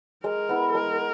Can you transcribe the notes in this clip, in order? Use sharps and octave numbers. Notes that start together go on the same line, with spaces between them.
G#3 A#4
B3 E4
G#3 A#4